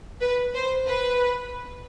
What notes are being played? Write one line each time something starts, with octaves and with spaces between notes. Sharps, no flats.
B4
C5
B4